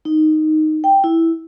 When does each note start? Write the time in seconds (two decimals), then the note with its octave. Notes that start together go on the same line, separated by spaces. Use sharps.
0.05 D#4
0.84 G5
1.04 E4